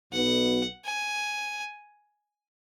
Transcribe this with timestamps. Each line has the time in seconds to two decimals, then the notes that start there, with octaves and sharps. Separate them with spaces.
0.12 B1 B2 B3 F#5
0.85 G#5